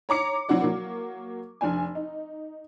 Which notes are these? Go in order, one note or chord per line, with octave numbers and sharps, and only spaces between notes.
C#5 A#5 D6 C#7
F#3 C4 E4 F#4 D5
F#3 A#3
F1 D4 G#5
D#4